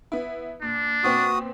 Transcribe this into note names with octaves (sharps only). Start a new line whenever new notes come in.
B3 E4
A#2 D4
A#2 B3 C4 F#4 D#6